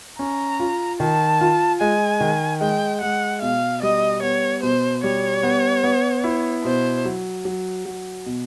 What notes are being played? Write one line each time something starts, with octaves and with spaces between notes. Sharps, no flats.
C#4 A#5
F4
D#3 A5
F4
G#3 G#5
D#3
G#3 G5
G#3 F#5
B2 F5
G3 D#5
B3 C#5
B2 C5
G3 C#5
B3
B3
E4
B2 C5
F#3
F#3
F#3
B2